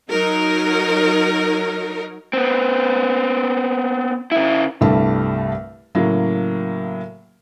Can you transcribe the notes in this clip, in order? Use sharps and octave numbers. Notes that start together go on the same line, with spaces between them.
F#3 D#4 A#4
B3 C4
C#3 E4
C2 G2 G3 A3 A5
A2 C#3 F#3 A#3